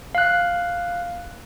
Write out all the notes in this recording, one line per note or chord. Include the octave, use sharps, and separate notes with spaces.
F5 F#6